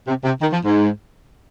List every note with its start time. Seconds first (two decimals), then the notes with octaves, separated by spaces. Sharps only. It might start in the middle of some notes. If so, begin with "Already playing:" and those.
0.08 C3
0.24 C3
0.41 D#3
0.52 F3
0.64 G#2